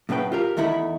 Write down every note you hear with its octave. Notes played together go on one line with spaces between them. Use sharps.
F#2 A2 C#3 B4 G5
F4 G4 A#4
E2 D#3 A3 E4 B5